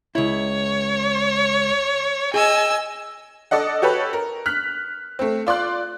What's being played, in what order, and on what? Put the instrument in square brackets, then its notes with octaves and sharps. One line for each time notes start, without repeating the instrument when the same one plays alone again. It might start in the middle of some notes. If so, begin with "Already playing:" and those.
[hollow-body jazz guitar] C#2 E4 [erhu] C#5
[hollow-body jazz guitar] G#4 [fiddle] D#5 E6 [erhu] G#5
[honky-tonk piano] A4 D5 D#5 F#5
F#4 G4 A4 B4 C#5
A#4
F6 F#6 B6
A3 C4
F4 D5 C6 F#6